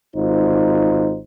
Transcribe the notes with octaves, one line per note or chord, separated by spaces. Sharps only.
G#1 D#4 F4 C5